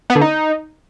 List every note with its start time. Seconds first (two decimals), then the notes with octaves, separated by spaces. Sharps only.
0.10 B3
0.15 D3
0.21 D#4